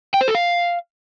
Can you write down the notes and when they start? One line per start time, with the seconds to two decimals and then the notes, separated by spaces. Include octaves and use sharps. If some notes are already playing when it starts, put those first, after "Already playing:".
0.14 G5
0.21 C5
0.28 A4
0.35 F5